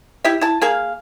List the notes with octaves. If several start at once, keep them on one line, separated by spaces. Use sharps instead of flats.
E4 G4 E5
E4 A5
A#3 G#4 F5